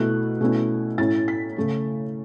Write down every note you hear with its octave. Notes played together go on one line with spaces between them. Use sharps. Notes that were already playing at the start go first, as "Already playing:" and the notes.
Already playing: B2 A3 E4 F#6
B2 A3 C#4 E4
A2 A3 C#4 E4 A6
B6
C#3 A3 C#4